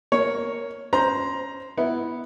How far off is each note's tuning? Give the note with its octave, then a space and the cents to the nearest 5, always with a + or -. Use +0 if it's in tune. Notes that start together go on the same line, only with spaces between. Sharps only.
A#3 +0 C#5 +0
C#4 +0 C5 +0 A#5 +15
B3 +0 E4 +0